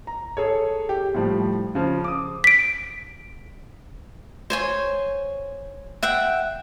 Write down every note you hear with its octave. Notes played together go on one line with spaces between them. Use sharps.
A#5
G#4 A4 C#5
G4
A2 F3 G3
C#3 F3
D6 D#6
B6 D7
C5 C#5 G#5
E5 F#5 G5